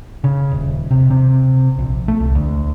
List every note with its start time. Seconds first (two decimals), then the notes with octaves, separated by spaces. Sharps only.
0.24 C#3
0.51 D#1
0.91 C3
1.10 C3
1.79 A#1
2.08 A3
2.20 C2
2.35 D2